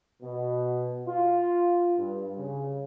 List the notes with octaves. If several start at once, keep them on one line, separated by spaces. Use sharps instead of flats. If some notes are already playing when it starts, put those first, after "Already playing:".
B2
F4
G2
C#3